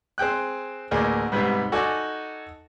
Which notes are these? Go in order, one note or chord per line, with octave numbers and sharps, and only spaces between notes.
C4 G#4 G5 F#6
A1 D2 A#3 G#4 D5
G#2 C3 G3 B3
D#4 F#4 A4 D5 G#5